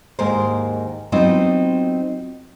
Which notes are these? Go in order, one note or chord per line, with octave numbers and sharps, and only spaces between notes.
D#2 G#2 A#3 A#4 C5
F#3 B3 C4 D#4 F4